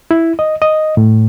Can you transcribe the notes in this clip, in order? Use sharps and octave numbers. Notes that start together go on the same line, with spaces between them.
E4
D#5
D#5
A2